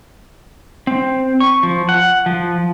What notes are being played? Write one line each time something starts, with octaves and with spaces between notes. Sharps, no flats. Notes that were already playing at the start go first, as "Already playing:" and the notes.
C4
C#6
F3
F#5
F3